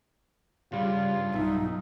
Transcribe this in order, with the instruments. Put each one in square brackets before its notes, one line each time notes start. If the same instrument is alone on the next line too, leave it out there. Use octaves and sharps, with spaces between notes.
[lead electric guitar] G2 [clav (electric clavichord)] C#3 G3 [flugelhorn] F4
[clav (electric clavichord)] B1 E5 [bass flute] D#4